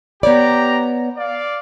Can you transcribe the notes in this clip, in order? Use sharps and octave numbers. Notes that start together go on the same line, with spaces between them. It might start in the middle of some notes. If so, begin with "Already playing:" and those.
B3 G4 C#5 D5 A#5
D5 F5